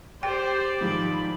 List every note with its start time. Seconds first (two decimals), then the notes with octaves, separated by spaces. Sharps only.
0.23 G4 C5 D5 G5
0.81 G#2 D#3 F3 B5